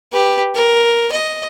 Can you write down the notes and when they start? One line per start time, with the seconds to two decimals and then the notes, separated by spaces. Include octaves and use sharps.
0.12 G4 B4
0.55 A#4
1.12 D#5